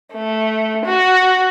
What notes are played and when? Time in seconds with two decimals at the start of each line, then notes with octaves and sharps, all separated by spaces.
0.14 A3
0.85 F#4